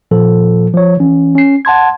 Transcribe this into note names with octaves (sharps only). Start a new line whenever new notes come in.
A#2 F3 A4
F3 C#5
E3 C#4
C#4 C7
F#5 A5 C6 G#6